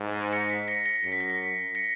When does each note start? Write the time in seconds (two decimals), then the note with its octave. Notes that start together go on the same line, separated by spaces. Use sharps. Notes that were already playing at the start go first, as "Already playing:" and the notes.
Already playing: G#2
0.33 A#6 C#7
0.50 B6
0.68 A#6 C#7
0.86 A#6 C#7
1.04 F#2 C#7
1.12 B6
1.20 A#6
1.30 B6
1.75 A#6 C#7